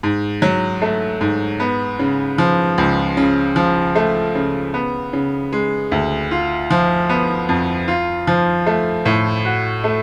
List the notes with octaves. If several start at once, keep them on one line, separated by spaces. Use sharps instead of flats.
G#2
F#3
A3
G#2
B3
C#3
F3
C#2
C#3
F3
A3
C#3
B3
C#3
G#3
D2
F4
F3
B3
F2
F4
F3
A3
A2
F#4
A3